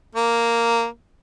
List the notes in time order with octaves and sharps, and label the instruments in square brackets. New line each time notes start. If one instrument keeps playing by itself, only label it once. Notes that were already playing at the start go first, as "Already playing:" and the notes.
[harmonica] A#3